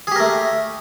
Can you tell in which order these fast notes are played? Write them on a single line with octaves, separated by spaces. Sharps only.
G#4 G4 A#4 A3